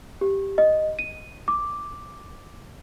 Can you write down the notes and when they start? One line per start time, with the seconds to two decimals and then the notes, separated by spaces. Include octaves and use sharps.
0.21 G4
0.58 D#5
0.99 D#7
1.48 D6